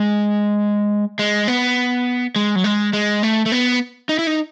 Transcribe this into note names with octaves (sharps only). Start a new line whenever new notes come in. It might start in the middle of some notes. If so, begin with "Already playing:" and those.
Already playing: G#3
G#3
B3
G#3
F#3
G#3
G#3
A3
A3
B3
D#4
E4
D#4